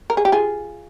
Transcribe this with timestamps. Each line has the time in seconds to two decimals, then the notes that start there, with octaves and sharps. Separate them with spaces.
0.10 A#4
0.17 G#4
0.25 G4
0.32 F4 G#4